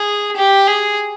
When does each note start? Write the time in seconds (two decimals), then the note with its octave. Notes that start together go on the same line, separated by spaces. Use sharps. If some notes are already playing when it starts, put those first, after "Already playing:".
Already playing: G#4
0.36 G4
0.67 G#4